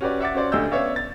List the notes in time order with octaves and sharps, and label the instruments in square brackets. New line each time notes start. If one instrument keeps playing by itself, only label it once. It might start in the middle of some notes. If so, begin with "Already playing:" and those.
[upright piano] C#4 F#4 G4 B4 D5
E5 F#5 D6 A6
C#4 F#4 C5 D5
D2 D3 G4 D#5 E6 G6
B3 C#4 C#5 D5 E5 F5
A6